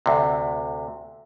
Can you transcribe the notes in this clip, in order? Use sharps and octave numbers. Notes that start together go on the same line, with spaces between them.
D2 C3